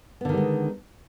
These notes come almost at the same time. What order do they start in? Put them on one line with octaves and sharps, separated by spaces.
B3 D3 D#3 G3 G#3